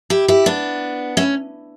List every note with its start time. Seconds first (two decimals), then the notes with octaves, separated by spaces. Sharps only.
0.10 E4 G4
0.28 E4 G4
0.46 B3 D4
1.17 C#4 E4